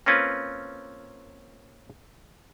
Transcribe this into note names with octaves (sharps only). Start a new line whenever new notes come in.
A#3 C4 C#4 F4 B4